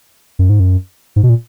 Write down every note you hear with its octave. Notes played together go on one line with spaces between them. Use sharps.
F#2
G#2
F#2
G#2
B2
A#2